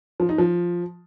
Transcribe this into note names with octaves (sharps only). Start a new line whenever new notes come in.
F3
D#4
F3